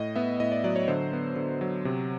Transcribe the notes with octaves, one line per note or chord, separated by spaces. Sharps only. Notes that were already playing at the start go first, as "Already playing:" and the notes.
Already playing: A2 D#5
B3 E5
A2 D#5
D5
F#3 D5
C#5
D3 C5
B3
D3
F#3
C3